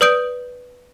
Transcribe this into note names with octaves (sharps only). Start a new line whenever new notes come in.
B4 D5 D#6 G6 D7